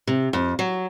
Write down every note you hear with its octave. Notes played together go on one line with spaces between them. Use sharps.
C3
F2
F#3